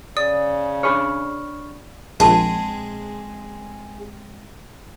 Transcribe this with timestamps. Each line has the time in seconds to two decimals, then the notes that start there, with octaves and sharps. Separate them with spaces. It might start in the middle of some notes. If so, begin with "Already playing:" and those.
0.17 C#3 D5 D#6
0.83 D4 G#4 C#5 B5 C#6 F6
2.20 A#1 G#3 C4 G#4 A5